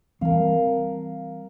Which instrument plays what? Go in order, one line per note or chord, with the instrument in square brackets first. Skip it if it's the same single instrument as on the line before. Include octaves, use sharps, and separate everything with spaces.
[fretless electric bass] E3 G3 C4 [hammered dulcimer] A#4 F5